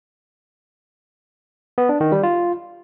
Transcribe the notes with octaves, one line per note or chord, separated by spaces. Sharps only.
B3
D4
D#3
G3
F4